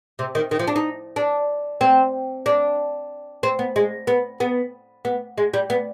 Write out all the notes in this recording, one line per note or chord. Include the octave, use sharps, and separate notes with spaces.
C3
D#3
D#3
F3
D4
D#4
D4
C4
D4
C4
B3
G#3
B3
B3
B3
G#3
G3
B3